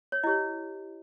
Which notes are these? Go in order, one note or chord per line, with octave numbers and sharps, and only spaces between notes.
C#5
E4 G4 C#5 D#5